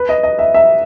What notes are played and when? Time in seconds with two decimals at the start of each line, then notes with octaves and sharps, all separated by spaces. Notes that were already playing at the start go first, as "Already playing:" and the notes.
Already playing: B4
0.09 D#5
0.23 D#5
0.39 E5
0.54 E5